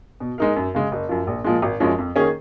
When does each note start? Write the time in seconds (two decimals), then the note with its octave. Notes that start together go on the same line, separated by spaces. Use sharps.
0.20 B2
0.38 G#3 D#4 A#4
0.56 F#2
0.74 C#3 G#3
0.92 F#1
1.09 F#2 F3
1.27 A#1
1.44 A#2 F3 G#3
1.62 G#1
1.80 F#2 F3 G#3 C#4
1.98 F2
2.16 D#3 A#3 C#4 G#4